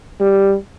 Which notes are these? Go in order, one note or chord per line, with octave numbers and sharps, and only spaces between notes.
G3